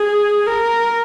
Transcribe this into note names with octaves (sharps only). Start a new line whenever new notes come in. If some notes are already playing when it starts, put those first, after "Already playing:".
Already playing: G#4
A#4